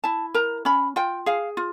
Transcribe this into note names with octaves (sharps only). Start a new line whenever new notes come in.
E4 A5
A#4 A#5
C#4 B5
F4 G5
G#4 F5
F4